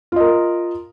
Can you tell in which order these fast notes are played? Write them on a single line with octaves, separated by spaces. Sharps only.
F4 D#5 A#4